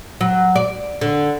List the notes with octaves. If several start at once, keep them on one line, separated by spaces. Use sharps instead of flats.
F#3
D5
D3